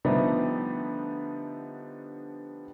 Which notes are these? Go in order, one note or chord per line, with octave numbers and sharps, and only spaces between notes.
D3 F3 G3 A3 B3 D#4